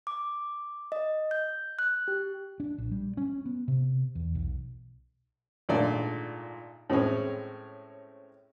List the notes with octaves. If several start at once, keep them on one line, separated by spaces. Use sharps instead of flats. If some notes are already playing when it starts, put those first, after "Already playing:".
D6
D#5
G6
F#6
G4
D4
A#1
G3
C#4
B3
C3
E2
B1
G#1 A#2 D3 A3 D5
A2 G#3 C4 C#4